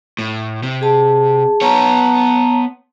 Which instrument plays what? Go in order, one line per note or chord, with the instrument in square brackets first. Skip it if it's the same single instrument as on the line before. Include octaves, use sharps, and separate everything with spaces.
[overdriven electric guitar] A2
C3
[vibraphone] G#4 A5
[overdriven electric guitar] B3 C#5 [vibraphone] A5 A#5